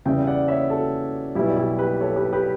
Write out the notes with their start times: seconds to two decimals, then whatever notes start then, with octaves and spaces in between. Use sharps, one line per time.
0.05 E2 C#3 G3 E5 G5
0.27 D5 F#5
0.48 C#5 E5
0.70 F#4 A4
1.35 B1 B2 G3 E4 G4
1.57 E4 G4
1.79 G4 B4
2.01 A4 C#5
2.16 G4 B4
2.33 G4 B4